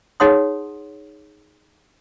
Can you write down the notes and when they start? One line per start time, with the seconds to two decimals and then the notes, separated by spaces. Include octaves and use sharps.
0.20 D#4 G#4 C#5 F#5 C6 D#6